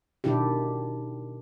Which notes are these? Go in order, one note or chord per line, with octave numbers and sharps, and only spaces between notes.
B2 D#3 D4 E4 G4